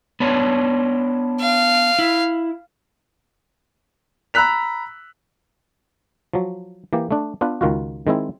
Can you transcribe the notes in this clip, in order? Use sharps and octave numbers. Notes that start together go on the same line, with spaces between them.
B3 D4 C#5
F5
E4
A#5 B5 E6 F#6 B6 F7
F3 F#3
E3 A#3 G4
A3 D4
B3 D4 F4 B4
C#2 D#3 F4 F#4
D#3 G#3 C4 E4